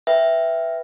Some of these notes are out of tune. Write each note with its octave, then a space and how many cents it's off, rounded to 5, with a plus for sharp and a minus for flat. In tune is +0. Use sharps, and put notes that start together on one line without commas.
B4 +0 E5 +0 G5 +0